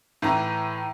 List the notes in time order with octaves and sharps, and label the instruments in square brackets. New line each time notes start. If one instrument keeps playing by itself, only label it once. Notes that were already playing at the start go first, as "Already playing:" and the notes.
[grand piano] A2 E3 A#5